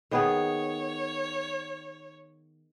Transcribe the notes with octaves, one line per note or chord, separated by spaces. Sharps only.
D#3 B3 G#4 C#5